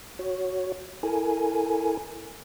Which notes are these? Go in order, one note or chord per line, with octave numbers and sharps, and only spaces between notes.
F#4 C#5
E4 A4 A#4 G#5